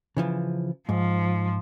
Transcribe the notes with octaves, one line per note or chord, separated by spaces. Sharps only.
C#3 E3 F3
G#2 F3